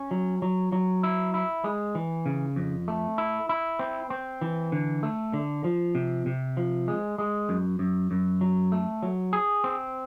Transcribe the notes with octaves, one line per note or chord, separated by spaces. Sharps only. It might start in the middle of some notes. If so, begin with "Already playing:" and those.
Already playing: C#4
F#3
F#3
F#3
E4
E4
G#3
E3
C#3
F2
A3
E4
E4
C4
C4
E3
D3
A3
D3
F3
C3
C3
F3
G#3
G#3
F#2
F#2
F#2
F#3
A3
F#3
G#4
C4